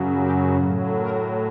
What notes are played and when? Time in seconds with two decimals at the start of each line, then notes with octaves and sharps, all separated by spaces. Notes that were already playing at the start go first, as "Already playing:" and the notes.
Already playing: F#2 C#3 F#3
0.19 G4
0.59 A2 F#3
0.98 A#4